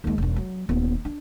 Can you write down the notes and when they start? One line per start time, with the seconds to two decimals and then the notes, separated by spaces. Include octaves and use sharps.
0.04 D#2 G#3
0.18 E1 G2
0.36 F#3
0.69 D#1 B3
1.05 D4